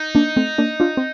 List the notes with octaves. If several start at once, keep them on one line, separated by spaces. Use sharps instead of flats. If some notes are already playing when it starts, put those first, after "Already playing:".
Already playing: D#4
A#3 D4
A3 C4
A#3 D4
D4 F4
C4